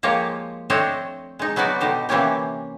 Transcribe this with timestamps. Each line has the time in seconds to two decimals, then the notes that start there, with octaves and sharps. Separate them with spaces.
0.03 F3 G#3 A#3 G4 C#5
0.70 A3 C4 D4 C5 C#5 D#5
1.39 G#3 D#4
1.56 F#3 B3 D#4 F#4 D5
1.80 B2 D3 D#4 G4 C5
2.09 C3 E3 A#3 C4 C#4 G4